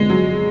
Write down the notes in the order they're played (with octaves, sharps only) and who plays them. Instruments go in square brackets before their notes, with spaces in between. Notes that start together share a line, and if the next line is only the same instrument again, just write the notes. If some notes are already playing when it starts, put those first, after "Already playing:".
Already playing: [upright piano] D3 F3 B3 [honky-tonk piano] G#3
[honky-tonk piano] F#3